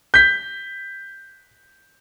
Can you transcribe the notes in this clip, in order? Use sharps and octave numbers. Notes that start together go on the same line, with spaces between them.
G6 B6